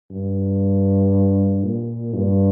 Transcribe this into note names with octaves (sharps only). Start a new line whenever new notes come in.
G2
A#2
G2